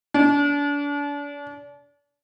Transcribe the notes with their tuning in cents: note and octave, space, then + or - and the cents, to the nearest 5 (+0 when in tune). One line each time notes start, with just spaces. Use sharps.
D4 -35